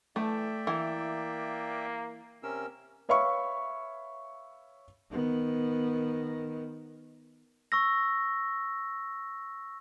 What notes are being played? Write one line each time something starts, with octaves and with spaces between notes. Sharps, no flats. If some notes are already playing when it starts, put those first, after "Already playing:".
E3 A3 D5 E5 G5
E3 A#3
C3 C#4 A#4 E6
B4 C#5 E5 F5 B5 C#6
D#3 B3
C#6 E6 A#6